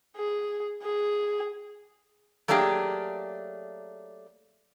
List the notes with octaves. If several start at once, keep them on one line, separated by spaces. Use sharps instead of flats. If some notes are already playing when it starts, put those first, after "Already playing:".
G#4
G#4
F#3 A3 A#3 D4 G4 G#4